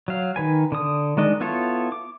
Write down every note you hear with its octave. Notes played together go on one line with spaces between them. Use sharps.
F#3 F5
D#3 B4 G#5
D3 D#6
D#3 G#3 D4 D#5
B3 E4 F4 A4 C#5
D6